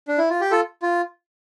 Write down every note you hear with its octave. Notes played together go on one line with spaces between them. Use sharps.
D4
E4
F4
G4
F4 A4
F4